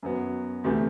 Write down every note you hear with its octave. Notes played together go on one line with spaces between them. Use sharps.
F#2 F#3 B3
D2 C3 E3 A3